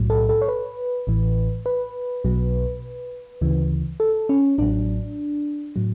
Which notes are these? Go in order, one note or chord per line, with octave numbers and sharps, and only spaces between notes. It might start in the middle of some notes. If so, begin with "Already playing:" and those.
Already playing: B1 A2 F#3
A4
A4
C#5
B4
A1 A2 E3
B4
B1 B2 F#3
D2 C#3 E3
A4
C#4
A1 A2 F#3 D4
A2 F#3